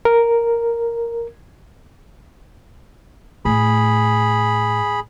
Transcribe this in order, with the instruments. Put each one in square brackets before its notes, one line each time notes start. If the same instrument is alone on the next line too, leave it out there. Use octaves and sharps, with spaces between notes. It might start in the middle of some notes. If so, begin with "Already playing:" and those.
[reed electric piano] A#4
[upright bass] A2 [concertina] G#4 B5